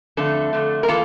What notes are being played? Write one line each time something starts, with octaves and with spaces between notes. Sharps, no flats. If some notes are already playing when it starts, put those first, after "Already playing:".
F2 D3 A3 A4
F2 D3 A3
A#4
E3 A#3 F4 A4